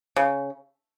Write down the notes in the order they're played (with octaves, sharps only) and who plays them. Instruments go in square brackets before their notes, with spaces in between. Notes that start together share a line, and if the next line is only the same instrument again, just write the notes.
[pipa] C#3